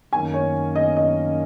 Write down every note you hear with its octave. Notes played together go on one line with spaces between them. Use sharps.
F#2 D#3 A#3 C#4 G#5
C#5
D#5
D#5